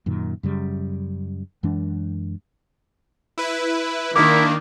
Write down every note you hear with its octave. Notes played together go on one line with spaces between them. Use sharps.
F#2 A#2 D#3
F#2 C#3 G3
F#2 E3 G#3 D4
E4 B4
D#3 A#3 D4 E4 D6